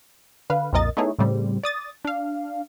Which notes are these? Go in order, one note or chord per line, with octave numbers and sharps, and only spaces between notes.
D3 B4 F5
B1 F2 A#2 A#4 D#5 A6
A3 B3 D#4 E4 G#4 C#5
A2 C#3 G3 C4
D5 D#6 A6
D4 F5